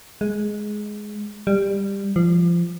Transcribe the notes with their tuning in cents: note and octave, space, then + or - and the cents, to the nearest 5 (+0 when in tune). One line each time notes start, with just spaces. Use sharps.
G#3 +10
G3 +15
F3 -20